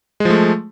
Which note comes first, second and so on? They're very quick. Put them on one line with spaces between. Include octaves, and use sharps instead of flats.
G#3 F3 A3